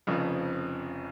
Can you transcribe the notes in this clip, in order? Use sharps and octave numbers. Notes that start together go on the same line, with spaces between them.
F1 F2 C#3 F3